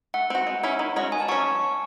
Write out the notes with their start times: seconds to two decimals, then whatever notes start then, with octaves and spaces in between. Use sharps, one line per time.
0.14 A3 F#5
0.30 C4 F#4
0.47 G#3
0.63 C#4 E4 G#4
0.79 D#3
0.96 G#3 C#4 F#4
1.12 D#3 G#5
1.20 A5
1.28 F#3 C#6
1.32 C#4